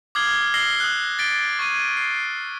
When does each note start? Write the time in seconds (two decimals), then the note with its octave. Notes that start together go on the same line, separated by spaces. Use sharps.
0.15 D6 D#6 F6 G#6 C7 G7
0.54 E6 F6 A#6 C7 F#7 G7
0.80 D#6 F#6
1.19 A6 B6 D7 G7
1.59 C#6 G#6 D#7
1.97 C7